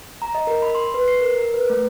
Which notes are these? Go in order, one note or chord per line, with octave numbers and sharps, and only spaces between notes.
A#5
D#5
A#4
B5
C6
B4
C7
A#4
A#4
B4
A3